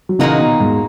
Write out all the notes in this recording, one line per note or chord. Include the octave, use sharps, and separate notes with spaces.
F#3
A#2 C#3 E3 A#3 D#4 F#4
B2 D#3
E2 G#2